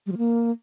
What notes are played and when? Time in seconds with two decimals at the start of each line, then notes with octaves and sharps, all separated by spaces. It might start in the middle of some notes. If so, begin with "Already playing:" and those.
0.06 G3
0.12 F3
0.18 A#3